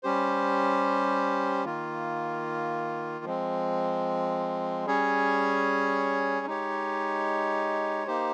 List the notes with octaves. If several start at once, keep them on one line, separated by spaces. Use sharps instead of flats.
G3 C#4 G4 C5
D#3 A#3 F4
F3 G#3 C4
G3 C#4 G#4 C#5
G#3 D#4 G4 C#5
A#3 D#4 G4 C5